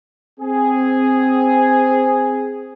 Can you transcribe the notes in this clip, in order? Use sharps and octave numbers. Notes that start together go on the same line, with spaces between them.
C4 G#4